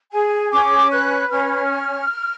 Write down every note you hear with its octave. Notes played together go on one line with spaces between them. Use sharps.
G#4 G#5
C#4 D6
B4 F#6
C#4 F6